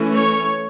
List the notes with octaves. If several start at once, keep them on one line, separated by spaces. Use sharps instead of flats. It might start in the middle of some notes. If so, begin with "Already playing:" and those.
Already playing: E3 A3 C#4
C#5